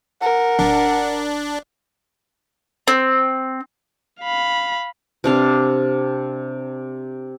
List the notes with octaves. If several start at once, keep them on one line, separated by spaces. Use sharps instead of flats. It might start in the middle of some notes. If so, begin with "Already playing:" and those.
A#4 F#5
D1 D4
C4
F5 B5
C3 D4 F5